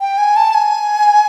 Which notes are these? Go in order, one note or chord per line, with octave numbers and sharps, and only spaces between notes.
G5
G#5
A5
G#5